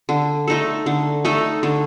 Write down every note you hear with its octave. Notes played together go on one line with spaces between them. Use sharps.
D3
A3 D#4 A4
D3
A3 D#4 A4
D3